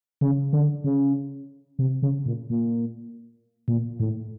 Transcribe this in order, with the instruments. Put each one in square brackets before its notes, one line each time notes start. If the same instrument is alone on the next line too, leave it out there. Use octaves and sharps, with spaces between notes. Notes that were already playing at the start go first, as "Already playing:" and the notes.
[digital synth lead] C#3
D3
C#3
C3
C#3
A#2
A#2
A#2
A2